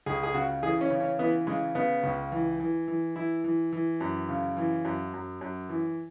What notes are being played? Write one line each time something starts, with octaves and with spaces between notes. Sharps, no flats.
C#2 G#4
G#4
C#3 F#4
E3 G#4
C#4
C#3
C#4
E3 B3
C#3 G#3
C#3 B3
C#2
E3
E3
E3
E3 E4
E3
E3
F#2
C#3
E3
F#2
F#2
F#2
E3